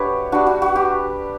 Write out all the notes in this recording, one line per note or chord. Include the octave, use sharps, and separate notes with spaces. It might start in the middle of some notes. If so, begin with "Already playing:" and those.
Already playing: F#3 A3 D4 G4 B4 C#5
G3 D4 F#4
F#4
F#4
G4